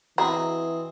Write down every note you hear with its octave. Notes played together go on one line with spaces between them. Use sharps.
E3 C4 F#4 G#4 D#5 F#5 A#5 B5